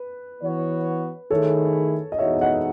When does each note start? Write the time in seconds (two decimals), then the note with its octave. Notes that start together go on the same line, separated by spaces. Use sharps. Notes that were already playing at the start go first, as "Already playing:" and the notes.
Already playing: B4
0.42 E3 B3 F#4 C#5
1.30 D#3 A3 E4 G#4 A4 C#5
2.12 D#5
2.18 E2 B2 G#3 D#4 F#4 C#5 E5
2.41 D#5 F#5